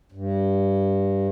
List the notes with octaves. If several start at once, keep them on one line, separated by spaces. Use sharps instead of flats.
G2